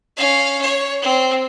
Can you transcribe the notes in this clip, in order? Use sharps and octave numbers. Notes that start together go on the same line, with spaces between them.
C#4 F5
C#5
C4